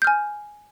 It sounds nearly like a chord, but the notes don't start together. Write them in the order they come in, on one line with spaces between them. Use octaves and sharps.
G6 F6 G#5